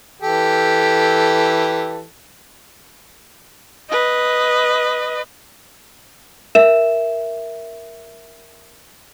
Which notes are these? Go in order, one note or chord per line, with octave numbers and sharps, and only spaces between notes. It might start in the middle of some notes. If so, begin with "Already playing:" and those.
E3 G4 A4
B4 D#5
A#4 E5 E7